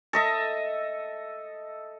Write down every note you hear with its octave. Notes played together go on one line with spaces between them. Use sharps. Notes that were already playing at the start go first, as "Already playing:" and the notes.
A4 D#5 E5